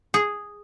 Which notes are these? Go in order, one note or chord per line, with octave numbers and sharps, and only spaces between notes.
G#4